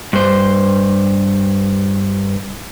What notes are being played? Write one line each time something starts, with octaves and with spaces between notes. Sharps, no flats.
G2 C5